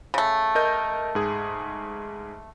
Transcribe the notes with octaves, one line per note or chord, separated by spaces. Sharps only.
C#3 A3
A#4 D#5 G6
G#2 G#4